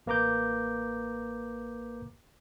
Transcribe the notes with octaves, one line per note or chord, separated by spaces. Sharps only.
A1 A#3 B4 A#5 D6 G6